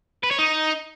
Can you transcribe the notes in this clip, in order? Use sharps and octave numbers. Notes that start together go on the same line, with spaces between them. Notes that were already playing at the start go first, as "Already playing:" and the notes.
B4
C#5
D#4